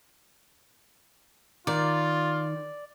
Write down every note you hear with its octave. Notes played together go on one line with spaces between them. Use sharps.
D#3 F4 D5